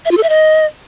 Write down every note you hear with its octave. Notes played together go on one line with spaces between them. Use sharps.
E5
F4
A4
E5
D#5